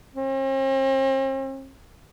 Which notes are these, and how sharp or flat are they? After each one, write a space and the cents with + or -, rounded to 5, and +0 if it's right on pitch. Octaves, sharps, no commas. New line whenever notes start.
C4 +45